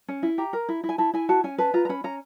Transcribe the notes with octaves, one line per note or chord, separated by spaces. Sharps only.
C#4
E4
G4 A#5
A#4
E4
E4
G#5
E4 A5
E4 G#5
F#4 A5
C#4 G#5
B4 A5
F4 A#5
A#5
C#4 B5
C#4 A#5